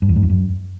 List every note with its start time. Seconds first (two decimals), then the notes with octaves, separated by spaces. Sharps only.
0.02 G2
0.09 E2
0.16 G#2
0.23 F2
0.30 F#2